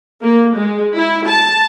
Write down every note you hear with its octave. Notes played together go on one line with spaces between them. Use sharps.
A#3
G#3
E4
A5